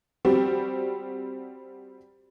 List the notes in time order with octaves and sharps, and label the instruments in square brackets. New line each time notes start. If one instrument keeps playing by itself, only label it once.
[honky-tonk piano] G3 C4 F#4 G4